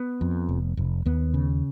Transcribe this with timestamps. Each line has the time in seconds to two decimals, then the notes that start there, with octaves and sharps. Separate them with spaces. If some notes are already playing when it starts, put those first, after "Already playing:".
Already playing: B3
0.21 F2
0.49 F1
0.77 F1
1.06 D#2 B3
1.34 C#3